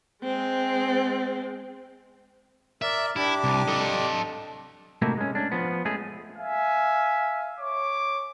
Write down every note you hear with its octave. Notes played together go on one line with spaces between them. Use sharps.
G#3 C4
A#4 D5 E5
D4 E4 G4 D6
C2
A4 D#5
C3 A3 A#3 D#4 E4 F#4
G#3 C#4
C#4 D4
F3 B3
G#3 A3 C#4 G#4
E5 F5 G#5
C#5 D6